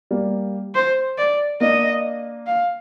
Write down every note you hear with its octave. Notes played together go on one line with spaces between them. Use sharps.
G3 A#3
C5
D5
A#3 D4 D#5
F5